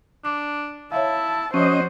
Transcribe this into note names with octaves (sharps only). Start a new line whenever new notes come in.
D4 D6
E4 C#5 E5 F5 A5
F3 C#4 F#4 C5 D#5